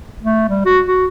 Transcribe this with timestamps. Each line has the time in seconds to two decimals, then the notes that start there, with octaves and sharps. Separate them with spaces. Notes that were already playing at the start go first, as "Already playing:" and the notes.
0.23 A3
0.49 G3
0.65 F#4
0.87 F#4